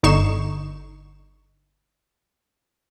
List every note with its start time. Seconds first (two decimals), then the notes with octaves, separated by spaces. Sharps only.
0.03 G1 D3 D#4 C#6 C7 E7